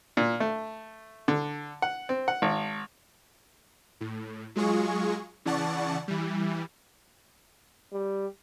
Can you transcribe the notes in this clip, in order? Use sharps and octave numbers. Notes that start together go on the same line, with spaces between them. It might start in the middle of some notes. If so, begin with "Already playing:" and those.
A#2
A3
D3
F#5
C4
F#5
G#1
A2
F#3 G#3 F4 G#4 C#6
C#3 E3 D5 F#5 A5 C#6
E3 G3
G3